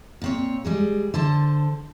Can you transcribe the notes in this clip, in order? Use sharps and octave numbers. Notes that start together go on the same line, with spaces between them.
A#2 C4 C#5
G3 G#3 G#4
D3 C5 A5